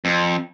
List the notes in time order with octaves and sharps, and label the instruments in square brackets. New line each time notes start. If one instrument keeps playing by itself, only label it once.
[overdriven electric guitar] F2